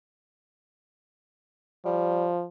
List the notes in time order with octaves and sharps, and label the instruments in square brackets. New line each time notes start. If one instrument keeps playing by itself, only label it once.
[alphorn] F3 [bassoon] G3